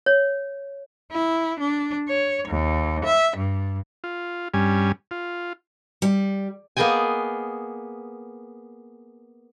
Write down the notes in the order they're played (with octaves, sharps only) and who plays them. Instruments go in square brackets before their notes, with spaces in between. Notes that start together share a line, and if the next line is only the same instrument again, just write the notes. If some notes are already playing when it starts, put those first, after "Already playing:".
[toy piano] C#5
[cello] E4
D4
C#5
D#2
E5
G2
[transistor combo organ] F4
G2 G3 C#4 G#5
F4
[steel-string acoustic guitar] G3
[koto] A#3 B3 G#4 D#5 G5 G#5